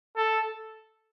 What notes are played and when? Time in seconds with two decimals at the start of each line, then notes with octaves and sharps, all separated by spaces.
0.17 A4